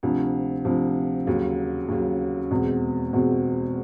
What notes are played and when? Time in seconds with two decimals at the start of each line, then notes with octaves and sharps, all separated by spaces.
0.03 D2 C3 F3
0.65 D2 C3 F3
1.27 D#2 C#3 F#3
1.88 D#2 C#3 F#3
2.50 E2 B2 G#3 C4
3.13 E2 B2 G#3 C4